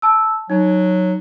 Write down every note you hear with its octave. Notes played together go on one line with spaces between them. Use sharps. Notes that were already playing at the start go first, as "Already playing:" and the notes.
A5 E6
F#3 D#4